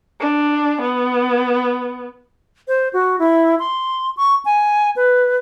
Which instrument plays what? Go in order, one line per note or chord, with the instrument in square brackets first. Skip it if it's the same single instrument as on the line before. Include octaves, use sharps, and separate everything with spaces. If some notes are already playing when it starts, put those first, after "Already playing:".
[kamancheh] D4
B3
[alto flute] C5
F#4
E4
C6
C#6
G#5
B4